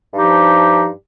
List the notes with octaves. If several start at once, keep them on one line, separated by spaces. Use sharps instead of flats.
G2 F3 D#4 G4